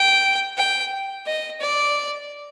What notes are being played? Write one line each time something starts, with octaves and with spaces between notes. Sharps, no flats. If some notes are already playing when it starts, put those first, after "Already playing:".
Already playing: G5
G5
D#5
D5